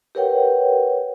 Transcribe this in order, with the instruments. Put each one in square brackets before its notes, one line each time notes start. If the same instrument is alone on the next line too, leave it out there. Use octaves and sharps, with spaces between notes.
[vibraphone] G4 A#4 B4 C#5 F#5 G5